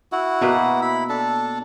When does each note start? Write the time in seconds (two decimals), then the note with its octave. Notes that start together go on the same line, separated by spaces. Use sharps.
0.12 E4 F#4
0.41 B2 A#3 B4
0.82 E4 B5
1.09 D4 A4